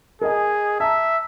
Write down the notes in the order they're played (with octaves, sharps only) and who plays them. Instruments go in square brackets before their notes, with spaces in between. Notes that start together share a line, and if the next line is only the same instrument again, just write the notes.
[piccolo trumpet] G#4 [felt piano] A#4 D#5 G#5
[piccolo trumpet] E5 [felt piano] A5 A#5